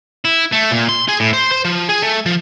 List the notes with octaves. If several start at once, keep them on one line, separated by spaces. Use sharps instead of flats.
E4
A3
A#2
C6
G#4
A2
C5
C5
F3
G#4
A3
F3